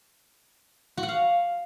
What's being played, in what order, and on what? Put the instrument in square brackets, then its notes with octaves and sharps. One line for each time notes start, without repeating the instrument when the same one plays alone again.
[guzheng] F#4
F#5
F5